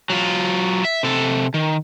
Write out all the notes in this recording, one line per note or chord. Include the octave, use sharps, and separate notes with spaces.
F#3 F4
E5
C3 A4
D#3